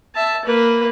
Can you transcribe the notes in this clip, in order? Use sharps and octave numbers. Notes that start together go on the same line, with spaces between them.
E5 A5
A#3 B4